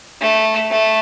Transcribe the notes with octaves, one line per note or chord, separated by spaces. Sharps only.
A3
A3